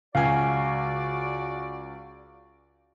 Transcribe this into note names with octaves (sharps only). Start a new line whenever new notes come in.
C#2 F#4 D5 F5 G#5